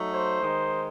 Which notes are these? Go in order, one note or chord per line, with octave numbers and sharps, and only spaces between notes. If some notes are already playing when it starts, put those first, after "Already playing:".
Already playing: F#3 A3 D#4
C5
D#3 G#3 D#4